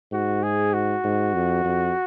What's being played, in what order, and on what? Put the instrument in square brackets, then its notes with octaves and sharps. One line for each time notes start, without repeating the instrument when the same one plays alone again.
[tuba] G#2 [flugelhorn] F#4
[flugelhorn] G#4
F#4
[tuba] G#2
F2
F2